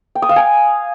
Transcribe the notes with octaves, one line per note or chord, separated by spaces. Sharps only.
G5
D#6
F5
G#5